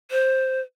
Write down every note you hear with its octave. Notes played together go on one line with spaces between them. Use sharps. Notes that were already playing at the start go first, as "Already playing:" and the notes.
C5